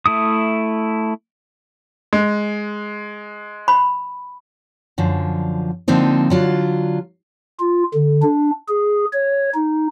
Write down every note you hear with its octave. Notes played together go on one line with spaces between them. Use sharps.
A3 E4 D#6
G#3
B5
F#2 D3 F3
D3 F3 A#3 C4 D#4
D3 F#3 F4
F4
D3
D4
G#4
C#5
D#4